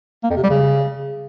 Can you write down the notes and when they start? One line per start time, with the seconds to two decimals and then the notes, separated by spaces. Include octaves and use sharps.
0.24 A#3
0.30 F2
0.37 C3
0.43 G3
0.50 C#3